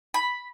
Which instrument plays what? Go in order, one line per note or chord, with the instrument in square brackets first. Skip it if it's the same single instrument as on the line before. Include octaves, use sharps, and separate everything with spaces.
[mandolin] B5